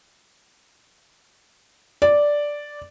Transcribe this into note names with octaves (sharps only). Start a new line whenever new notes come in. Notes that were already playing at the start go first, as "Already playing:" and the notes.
D5